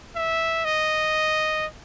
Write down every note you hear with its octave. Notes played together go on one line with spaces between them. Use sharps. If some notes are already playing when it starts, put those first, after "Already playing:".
E5
D#5